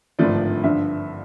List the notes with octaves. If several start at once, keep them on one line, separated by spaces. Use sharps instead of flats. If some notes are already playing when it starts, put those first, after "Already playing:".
G#1 G2 D3 F3 A3 D5
G2 D3 F3 E5